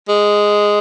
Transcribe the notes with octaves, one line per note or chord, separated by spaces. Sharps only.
G#3